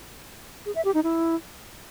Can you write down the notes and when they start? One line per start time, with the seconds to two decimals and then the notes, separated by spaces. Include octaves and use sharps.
0.66 G#4
0.75 E5
0.85 G4
0.94 D#4
1.04 E4